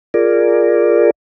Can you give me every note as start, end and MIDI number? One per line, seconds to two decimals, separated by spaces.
0.14 1.11 65
0.14 1.11 68
0.14 1.11 70
0.14 1.11 74